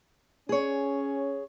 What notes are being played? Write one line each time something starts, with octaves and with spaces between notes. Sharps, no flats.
C#4 G#4 C#5